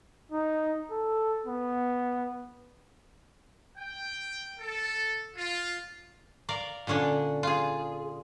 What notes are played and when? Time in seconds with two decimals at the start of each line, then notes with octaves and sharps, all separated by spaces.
0.32 D#4
0.91 A4
1.46 B3
3.77 G5
4.59 A4
5.36 F4
6.49 A#4 D5 F5
6.87 A#2 D3 C#4 D4
7.43 F4 G#4